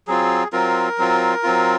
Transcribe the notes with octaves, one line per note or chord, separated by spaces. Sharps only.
F#3 C4 F4 G#4
F#3 C4 F4 A#4
F#3 C4 F4
F#3 C4 F4